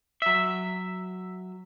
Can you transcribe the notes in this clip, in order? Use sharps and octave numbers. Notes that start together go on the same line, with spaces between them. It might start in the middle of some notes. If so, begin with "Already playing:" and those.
F#3 E5